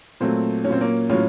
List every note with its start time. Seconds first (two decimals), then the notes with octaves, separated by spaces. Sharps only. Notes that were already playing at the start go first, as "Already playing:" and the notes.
0.20 A#2 F#3 A3 C4
0.65 F#3 C#4
0.70 A#2 C4
0.81 A#3 C#4
1.10 A2 F#3 C#4 F4